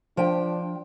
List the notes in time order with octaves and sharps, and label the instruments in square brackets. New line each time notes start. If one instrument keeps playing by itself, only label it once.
[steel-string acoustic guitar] F3 G5 [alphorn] D4